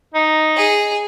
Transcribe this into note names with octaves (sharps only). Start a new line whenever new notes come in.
D#4
G#4